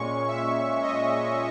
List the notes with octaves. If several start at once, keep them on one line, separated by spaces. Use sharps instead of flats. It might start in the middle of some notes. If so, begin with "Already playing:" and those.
Already playing: A#2 G#3 C#4 C#6
E5
D#5